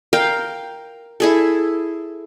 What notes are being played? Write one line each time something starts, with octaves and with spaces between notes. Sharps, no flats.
A#4 F5 G5
E4 G#4 A4